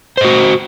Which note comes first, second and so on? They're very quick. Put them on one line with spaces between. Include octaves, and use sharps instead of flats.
C5 D#5 F#4